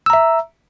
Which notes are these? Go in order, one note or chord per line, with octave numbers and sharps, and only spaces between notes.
E5 A#5 E6